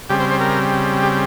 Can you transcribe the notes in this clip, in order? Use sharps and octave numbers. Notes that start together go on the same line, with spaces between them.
C#3 G3 C4 G4
C5
C5
A#4
G4